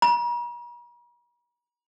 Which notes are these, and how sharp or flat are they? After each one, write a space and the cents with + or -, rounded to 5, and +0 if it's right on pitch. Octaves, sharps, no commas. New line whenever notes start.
A#5 +45